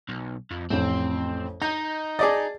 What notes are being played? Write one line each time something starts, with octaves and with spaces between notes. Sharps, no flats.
B1
F2
A1 F2 C4
D#4 A#5 G6
G#4 D5 D#5 A5 A6